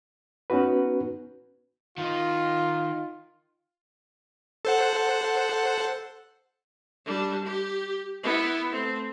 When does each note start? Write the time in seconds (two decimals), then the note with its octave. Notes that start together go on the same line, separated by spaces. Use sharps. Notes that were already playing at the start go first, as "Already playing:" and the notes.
0.50 B3 C#4 D#4 F#4 B4
1.98 D#3 D#4 F4
4.65 A4 C5 F#5
7.05 G3 D4
7.45 G4
8.23 B3 E4
8.72 A3 C4